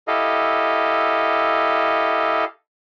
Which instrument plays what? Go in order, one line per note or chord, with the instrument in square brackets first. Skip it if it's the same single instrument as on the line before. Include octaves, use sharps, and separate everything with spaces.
[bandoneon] E4 G4 A4 D#5 F5